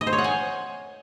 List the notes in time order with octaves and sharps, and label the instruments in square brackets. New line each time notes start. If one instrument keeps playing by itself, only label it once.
[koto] D#5
C5
C#5
F#5
G#5